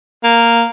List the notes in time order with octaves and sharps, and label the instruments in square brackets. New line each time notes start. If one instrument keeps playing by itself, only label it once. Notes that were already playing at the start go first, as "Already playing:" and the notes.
[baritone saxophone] A#3